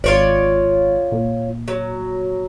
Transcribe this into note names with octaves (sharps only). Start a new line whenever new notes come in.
G#1 F4 C#5 D5
A#2
F#3